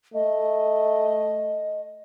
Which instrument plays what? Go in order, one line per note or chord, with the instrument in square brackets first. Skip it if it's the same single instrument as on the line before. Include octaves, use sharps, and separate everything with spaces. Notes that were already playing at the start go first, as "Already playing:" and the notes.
[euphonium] A3 [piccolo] D#5